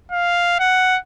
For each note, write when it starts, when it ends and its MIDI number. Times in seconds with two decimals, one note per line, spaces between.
0.12 0.59 77
0.60 0.98 78